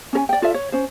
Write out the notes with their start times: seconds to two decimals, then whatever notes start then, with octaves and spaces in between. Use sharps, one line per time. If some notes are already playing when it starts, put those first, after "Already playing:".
0.13 C#4 A#4 G#5
0.29 D5 G5
0.42 F4 A4 D5 E5
0.54 C#5
0.72 C#4 C5